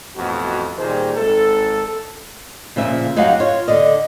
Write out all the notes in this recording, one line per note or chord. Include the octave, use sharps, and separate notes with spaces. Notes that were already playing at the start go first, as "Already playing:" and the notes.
A1 F2 B2 F#4
A#2 D#3 G3 G#4 C5
G#1 A4
A#2 C#3 F3 E5
F#2 D#4 F#4 G4 F5 F#5
F4 C#5
D3 D5 D#5